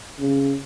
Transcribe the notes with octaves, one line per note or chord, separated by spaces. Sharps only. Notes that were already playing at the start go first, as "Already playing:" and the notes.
C#3